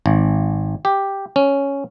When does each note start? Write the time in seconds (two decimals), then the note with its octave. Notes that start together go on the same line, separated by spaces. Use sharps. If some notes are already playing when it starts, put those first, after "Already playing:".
0.06 G#1
0.85 G4
1.36 C#4